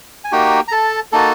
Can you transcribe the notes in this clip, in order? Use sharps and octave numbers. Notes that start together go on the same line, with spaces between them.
G#5
A#3 D#4 F#4 G4 G5
A#5
A4 A5
A#3 D#4 F#4 A4 A5